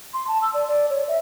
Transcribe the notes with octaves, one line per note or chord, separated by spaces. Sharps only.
C6
A5
E6
D5
D5
C#5
E5